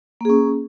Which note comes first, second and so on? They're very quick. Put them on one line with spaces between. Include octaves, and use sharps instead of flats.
A#3 G#4 C#4